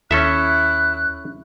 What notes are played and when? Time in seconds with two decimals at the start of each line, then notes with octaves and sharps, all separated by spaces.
0.11 D#2 C#4 E4 A4 E5 F#6